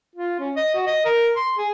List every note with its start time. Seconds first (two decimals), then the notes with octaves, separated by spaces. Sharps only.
0.15 F4
0.39 C#4
0.56 D#5
0.75 F#4
0.87 D#5
1.05 A#4
1.36 C6
1.58 G#4